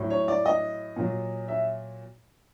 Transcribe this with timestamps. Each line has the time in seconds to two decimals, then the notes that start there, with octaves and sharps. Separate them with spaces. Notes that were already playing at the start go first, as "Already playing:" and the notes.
Already playing: A2 F#3
0.10 C#5
0.28 D5
0.46 D#5
0.96 A#2 F#3
1.48 E5